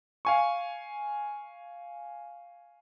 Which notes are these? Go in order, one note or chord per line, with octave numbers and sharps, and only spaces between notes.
F5 G#5 C#6